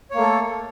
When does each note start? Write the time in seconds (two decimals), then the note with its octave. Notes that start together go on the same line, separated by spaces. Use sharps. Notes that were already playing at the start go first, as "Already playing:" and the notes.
0.11 C#5
0.14 A#3
0.18 A3
0.22 A4